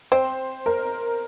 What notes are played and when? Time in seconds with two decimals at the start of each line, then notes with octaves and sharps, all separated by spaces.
0.12 C4 C5
0.66 A#4